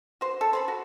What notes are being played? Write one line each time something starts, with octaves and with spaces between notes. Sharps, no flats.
F#4 C5
A4
C5 A5 B5
F#4